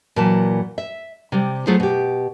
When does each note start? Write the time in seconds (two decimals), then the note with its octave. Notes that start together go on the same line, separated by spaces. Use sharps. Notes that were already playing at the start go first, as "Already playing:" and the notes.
0.16 A#2 E3 F#3 A5
0.78 E5
1.32 C3 G3
1.67 F#3 A3 E4 F4 G#4 C5
1.80 B2 G4